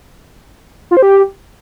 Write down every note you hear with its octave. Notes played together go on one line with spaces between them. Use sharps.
F4
C5
G4